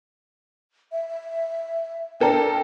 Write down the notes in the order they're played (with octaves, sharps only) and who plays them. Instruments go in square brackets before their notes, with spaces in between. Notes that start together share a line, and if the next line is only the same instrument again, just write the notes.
[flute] E5
[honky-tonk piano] D4 A4 A#4 [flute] G5